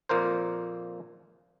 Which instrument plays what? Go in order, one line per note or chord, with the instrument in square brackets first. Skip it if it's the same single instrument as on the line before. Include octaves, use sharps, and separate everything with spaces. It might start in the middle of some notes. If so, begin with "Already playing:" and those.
[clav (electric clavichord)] F2 A#2 A#3 A#4 C5